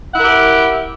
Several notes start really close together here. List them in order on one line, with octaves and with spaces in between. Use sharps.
F#5 E4 A#4 G4